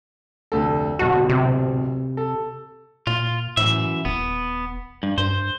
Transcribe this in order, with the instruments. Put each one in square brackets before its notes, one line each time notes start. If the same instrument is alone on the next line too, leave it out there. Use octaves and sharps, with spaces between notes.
[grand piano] F1 D2 A4
[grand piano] D1 B1 A5 [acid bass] F#4
[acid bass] C3
[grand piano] A4
[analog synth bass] A#2 [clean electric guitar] F4
[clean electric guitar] F#2 E3 E5 [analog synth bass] A2
[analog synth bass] D#1 [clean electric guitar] B3
[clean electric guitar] G2
[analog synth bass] G2 [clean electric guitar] C5